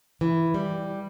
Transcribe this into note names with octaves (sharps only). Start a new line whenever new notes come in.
E3
G3